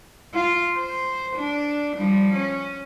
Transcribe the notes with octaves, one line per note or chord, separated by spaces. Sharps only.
F4
C5
D4
F3 G3
C#4